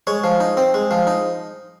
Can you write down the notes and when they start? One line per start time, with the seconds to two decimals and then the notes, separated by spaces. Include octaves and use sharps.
0.07 G#3 C#5
0.24 F3
0.40 D#4
0.57 C4
0.74 G#3
0.91 F3
1.07 D#4